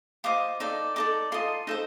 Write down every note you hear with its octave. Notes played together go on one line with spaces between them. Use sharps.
F4 C5 D#5 D6
D#4 A4 D5
D#4 A4 D5 D6
F4 A4 D#5 C6
D#4 A4 C5